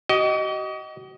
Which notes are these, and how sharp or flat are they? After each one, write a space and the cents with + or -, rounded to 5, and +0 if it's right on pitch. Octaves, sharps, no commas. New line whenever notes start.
F#4 +45 D#5 +0